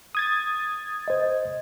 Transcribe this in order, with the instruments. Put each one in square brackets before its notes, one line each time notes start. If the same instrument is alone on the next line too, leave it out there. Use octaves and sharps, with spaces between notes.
[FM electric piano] D#6 G#6 A6
[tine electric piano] C5 D#5